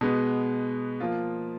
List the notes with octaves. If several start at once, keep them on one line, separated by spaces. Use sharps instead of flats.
B2 G#3 B3
F3 A#3 F4